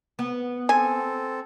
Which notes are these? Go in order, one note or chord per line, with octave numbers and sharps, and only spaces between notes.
B3
C4 A4 G#5